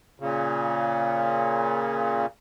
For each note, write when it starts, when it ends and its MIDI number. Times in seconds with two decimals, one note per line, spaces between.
0.20 2.26 46
0.20 2.26 49